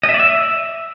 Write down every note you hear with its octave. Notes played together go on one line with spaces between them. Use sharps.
D#5
E5
D5
E5